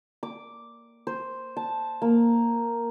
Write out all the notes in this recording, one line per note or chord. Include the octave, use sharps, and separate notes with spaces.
D6
C5
A5
A#3